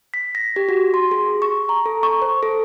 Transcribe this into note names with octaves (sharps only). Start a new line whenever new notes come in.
B6
A#6
G4
F#4
C6
G#4
C#6
A#5
A4
C#6
C5
A4